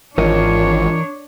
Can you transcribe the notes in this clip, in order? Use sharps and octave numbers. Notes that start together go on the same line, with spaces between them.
G#1 E3 D4 F4 A#4 C#5 D#5